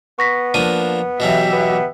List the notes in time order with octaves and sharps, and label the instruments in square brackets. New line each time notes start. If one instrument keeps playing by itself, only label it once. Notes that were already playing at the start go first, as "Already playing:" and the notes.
[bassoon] B3 [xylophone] C#6 A#6 B6
[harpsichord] F3 A#3 D4 [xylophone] D#7
[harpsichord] B2 E3 F#3 [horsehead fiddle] G4 E5
[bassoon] B3